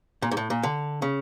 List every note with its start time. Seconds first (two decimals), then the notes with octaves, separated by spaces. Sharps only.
0.22 A#2
0.31 G#2
0.37 A2
0.50 A#2
0.63 D3
1.02 C#3